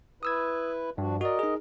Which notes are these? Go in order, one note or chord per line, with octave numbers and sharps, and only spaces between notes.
E4 B4 D#6 E6 G#6
G2 F3 D4 F#4
F#4 A#4 D5 D#5
D#4 G#4